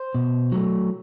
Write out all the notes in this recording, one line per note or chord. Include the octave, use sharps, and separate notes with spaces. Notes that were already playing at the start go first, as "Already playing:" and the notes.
Already playing: C5
B2
F#3 A3